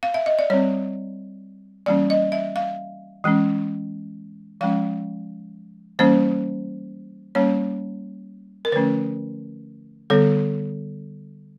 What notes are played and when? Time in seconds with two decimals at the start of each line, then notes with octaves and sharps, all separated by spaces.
0.03 F5
0.14 E5
0.26 D#5
0.39 D5
0.50 G3 C4 C#5
1.86 E3 G3 A#3 C#4 D5
2.10 D#5
2.32 E5
2.56 F5
3.24 E3 G#3 C#4
4.61 F3 G#3 C#4 F5
5.99 E3 G3 A#3 C#4 C5
7.35 G3 A#3 C#4 C#5
8.65 A#4
8.72 D3 F3 A3 C#4 B4
10.10 D3 G3 B3 A4